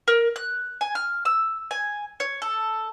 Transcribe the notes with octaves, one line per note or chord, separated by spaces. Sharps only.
A#4
F#6
G#5
F6
E6
G#5
C#5
A4